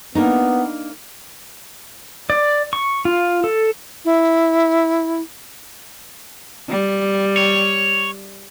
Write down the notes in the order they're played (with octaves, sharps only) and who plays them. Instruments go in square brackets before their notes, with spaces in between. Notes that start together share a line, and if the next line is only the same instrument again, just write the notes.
[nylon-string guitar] A#3 D4 D#4 [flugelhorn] B3
[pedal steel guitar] D5
C#6
F4
A4
[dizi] E4
[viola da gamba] G3
[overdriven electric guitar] C#5